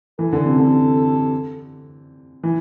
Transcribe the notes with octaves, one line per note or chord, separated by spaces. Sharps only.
E3 A4
D3
C3
D3
E3